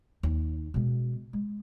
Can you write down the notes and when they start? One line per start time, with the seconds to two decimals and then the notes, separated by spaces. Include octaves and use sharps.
0.23 D#2
0.74 B2 G#3
1.33 G#3